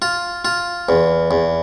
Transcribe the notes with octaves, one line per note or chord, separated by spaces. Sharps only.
F4
F4
E2
E2